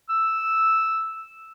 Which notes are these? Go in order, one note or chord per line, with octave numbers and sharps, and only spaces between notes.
E6